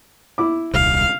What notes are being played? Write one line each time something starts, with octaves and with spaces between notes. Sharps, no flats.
E4 D6
D#1 C2 F5